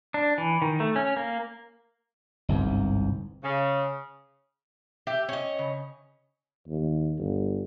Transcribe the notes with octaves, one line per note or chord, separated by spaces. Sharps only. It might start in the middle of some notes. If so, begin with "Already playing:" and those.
D4
E3
D#3
A3
C#4
A#3
G1 C2 G#2
C#3
G4 E5
C#4 D#5
C#3
D#2
G1